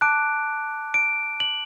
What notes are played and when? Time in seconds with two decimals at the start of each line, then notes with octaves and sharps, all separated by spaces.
0.01 A5 D6 F#6 D7
0.94 D7
1.40 F#7